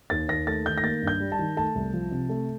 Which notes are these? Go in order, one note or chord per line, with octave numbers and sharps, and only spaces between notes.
D#2 A6
D#2 A#6
A3 A6
D#3 G6
A#6
A#3 A6
G2
G6
G3
A5
D#3
A3 A5
C2
F3
C3
A3